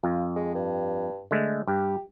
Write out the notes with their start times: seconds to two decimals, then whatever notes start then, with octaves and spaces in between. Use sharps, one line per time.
0.04 F2 F4
0.36 G#3
0.55 G2
1.31 D3 G#3 A3
1.67 G2 G4